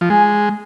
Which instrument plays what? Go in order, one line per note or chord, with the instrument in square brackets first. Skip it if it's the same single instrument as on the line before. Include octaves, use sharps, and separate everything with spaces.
[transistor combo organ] F3
[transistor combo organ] G#3 [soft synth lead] G#5